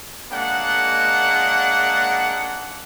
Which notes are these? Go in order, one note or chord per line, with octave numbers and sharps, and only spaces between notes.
G#3 A#3 D4 F#5